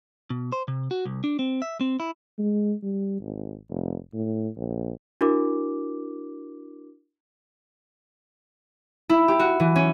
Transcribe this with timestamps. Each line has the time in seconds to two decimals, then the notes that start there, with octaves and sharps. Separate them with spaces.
0.30 B2
0.52 C5
0.68 C3
0.91 F#4
1.05 C2
1.24 D4
1.39 C4
1.62 E5
1.81 C4
2.00 E4
2.39 G#3
2.83 G3
3.21 G#1
3.70 F1
4.14 A2
4.57 A#1
5.21 D4 E4 F#4 A#4 D6
9.09 E4
9.28 G4
9.39 F#4
9.60 E3
9.76 C#4